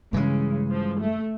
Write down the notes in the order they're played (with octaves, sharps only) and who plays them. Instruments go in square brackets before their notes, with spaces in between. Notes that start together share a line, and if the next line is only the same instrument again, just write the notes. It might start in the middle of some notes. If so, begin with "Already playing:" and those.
[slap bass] G2 E3 G#3 [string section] C#3
[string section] F3
A3